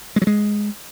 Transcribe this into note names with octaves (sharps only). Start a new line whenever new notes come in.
G#3
F#3
G#3